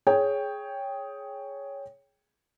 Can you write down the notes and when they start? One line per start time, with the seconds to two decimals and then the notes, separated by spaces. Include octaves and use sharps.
0.07 G#4 C#5 G5